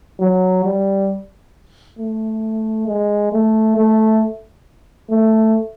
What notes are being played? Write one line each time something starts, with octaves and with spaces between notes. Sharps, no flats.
F#3
G3
A3
G#3
A3
A3
A3